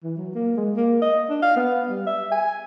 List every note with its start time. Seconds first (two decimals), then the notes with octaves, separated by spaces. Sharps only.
0.04 E3
0.17 F#3
0.35 A#3
0.57 G#3
0.76 A#3
1.02 D#5
1.30 D4
1.42 F5
1.57 B3
1.89 G3
2.07 E5
2.32 G#5